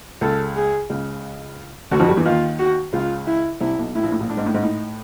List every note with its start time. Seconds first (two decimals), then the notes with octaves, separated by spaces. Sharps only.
0.21 C#2 C#3 A4
0.56 G#4
0.90 C#2 C#3
1.91 D2 D3 F#4
2.00 F2 F3
2.08 G2 G3
2.16 E2 E3
2.25 D#2 D#3 F4
2.59 F#4
2.93 C#2 C#3 F4
3.27 E4
3.61 C2 C3 E4
3.78 B1 B2
3.95 A2 E4
4.03 A#1 A#2
4.12 A2
4.20 A#1 A#2
4.29 A2 D4
4.37 G#2
4.46 A2
4.54 G#2
4.62 A2 D#4